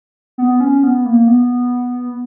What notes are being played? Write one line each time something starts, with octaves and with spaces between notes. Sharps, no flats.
B3
C#4
B3
A#3
B3